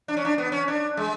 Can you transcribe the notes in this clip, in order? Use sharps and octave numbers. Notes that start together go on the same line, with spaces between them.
D4
C#4
D4
B3
C#4
D4
G#3